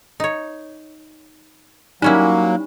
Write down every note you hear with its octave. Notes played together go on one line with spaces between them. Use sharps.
D#4 C#5
F#3 G3 A#3 C#4 D#4 E4